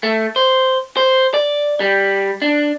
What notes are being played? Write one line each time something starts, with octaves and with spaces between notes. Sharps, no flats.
A3
C5
C5
D5
G3
D4